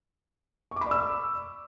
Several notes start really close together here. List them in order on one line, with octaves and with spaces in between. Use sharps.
C#6 D6 B5 D5 E6